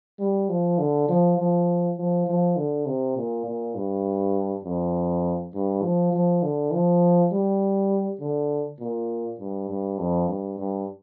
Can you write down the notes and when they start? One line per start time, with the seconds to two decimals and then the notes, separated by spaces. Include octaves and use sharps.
0.19 G3
0.49 F3
0.79 D3
1.09 F3
1.38 F3
1.98 F3
2.27 F3
2.57 D3
2.86 C3
3.17 A#2
3.46 A#2
3.76 G2
4.64 F2
5.54 G2
5.83 F3
6.13 F3
6.43 D3
6.73 F3
7.32 G3
8.20 D3
8.80 A#2
9.39 G2
9.70 G2
9.99 F2
10.28 G2
10.58 G2